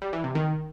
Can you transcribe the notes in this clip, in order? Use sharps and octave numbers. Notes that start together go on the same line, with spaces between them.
G3
E3
C3
D#3